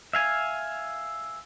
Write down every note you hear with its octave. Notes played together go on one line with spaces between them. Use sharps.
E5 F5 G#5